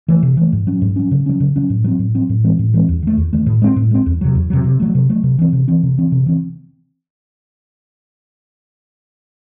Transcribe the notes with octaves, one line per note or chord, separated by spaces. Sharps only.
E3 A3
C3
E3 A3
G#2
F#3 C#4
G#2
F#3 C#4
C#3
F#3 C#4
C#3
F#3 C#4
A2
F#3 C4
A2
F#3 C4
A2
E3 G#3 C4
A2
E3 G#3 C4
E2
D#3 A3
E2
D#3 A3
A2
G#3 C4
A2
G#3 C4
E2
C3 F#3
E2
C3 F#3
C3
F#3 A3
C3
F#3 A3
C3
E3 C4
C3
E3 C4
C3
E3 C4
C3
E3 C4